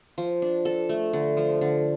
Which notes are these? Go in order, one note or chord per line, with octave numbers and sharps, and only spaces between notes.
F3
D4
A4
A3
D3
F3
D3